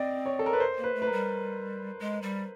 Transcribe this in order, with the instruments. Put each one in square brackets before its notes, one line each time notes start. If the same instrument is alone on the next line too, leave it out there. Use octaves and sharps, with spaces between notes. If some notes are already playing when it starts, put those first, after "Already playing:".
Already playing: [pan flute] C4 [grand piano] D5 D#5
[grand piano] C#5
A4
A#4
B4
C5
[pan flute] A#3
[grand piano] B4
[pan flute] A3
[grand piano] B4
A#4
[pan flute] G3
G#3
G3